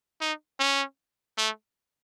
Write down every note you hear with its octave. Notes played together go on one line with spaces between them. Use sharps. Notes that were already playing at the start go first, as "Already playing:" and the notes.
D#4
C#4
A3